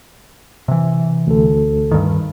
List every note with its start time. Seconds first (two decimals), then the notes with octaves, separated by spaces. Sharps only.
0.68 C3 E3
1.27 D2 A4
1.91 G2 D#3